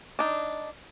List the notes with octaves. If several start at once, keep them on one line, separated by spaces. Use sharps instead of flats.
D4 D#4